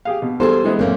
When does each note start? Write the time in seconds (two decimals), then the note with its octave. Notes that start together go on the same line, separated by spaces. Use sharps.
0.05 G4 G#4 F5
0.22 B2
0.40 E2 G3 G#4 A4 C5
0.64 E3 G#3 B3
0.79 F#2 A#2 A#3 C4 C#4